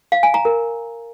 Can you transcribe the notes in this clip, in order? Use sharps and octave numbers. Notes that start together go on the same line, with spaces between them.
F5
G#5
A#5
A#4